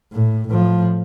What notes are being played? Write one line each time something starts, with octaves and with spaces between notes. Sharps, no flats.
A2
A2 F3